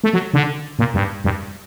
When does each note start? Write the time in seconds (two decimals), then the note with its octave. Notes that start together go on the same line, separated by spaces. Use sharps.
0.04 A3
0.13 F#3
0.34 D3
0.79 A#2
0.94 G2
1.24 G2